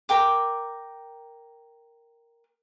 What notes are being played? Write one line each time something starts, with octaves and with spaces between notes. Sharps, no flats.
A#4 G5 D6